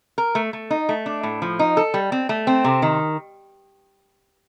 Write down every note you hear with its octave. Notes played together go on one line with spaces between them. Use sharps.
A#4
A3
A3
D#4
A3
D4
A2
F3
D#4
A4
G3
C4
A3
C4
C3
D#3